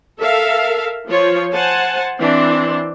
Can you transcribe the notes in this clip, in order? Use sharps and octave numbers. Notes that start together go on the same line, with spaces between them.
A4 A#4 E5 F5
F3 F4 C5 C#5
C5 F#5 G#5 A5
E3 C4 D4 C6